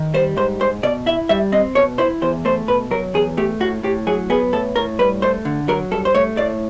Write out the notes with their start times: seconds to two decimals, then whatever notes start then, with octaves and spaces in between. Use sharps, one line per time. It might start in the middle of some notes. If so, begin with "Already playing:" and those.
Already playing: D#3
0.14 G3 C5
0.37 G#2 C5
0.61 G#2 C5
0.83 B2 D5
1.06 E4 E5
1.29 G3 E5
1.52 C4 D#5
1.75 B2 C#5
1.98 E4 C5
2.22 E2 C5
2.45 A3 C5
2.68 B2 B4
2.91 F#3 A#4
3.14 E2 G#4
3.37 A3 G4
3.60 A2 F#4
3.83 A2 G4
4.07 F#3 G#4
4.30 B3 G#4
4.53 A2 A4
4.76 A2 A#4
4.99 G2 B4
5.22 A3 C5
5.45 D3
5.68 F#3 A#4
5.92 G2 A4
6.05 C5
6.15 A3 C#5
6.37 A2 D5